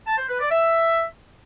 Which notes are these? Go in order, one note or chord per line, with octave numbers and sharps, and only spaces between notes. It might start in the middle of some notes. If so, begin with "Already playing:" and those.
A5
C5
B4
D5
E5